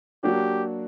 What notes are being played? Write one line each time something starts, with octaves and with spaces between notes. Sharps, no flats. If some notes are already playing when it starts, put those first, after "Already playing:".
F#3 A#3 D4 F#4 G4